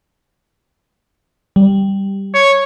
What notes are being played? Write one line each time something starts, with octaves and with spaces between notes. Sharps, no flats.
G3
C#5